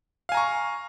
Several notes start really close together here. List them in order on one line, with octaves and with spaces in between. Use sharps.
F5 G#5 A#5 C#6